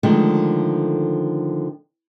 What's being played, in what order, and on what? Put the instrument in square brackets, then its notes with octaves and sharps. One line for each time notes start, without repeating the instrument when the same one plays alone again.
[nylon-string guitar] D3 D#3 F3 G#3 A3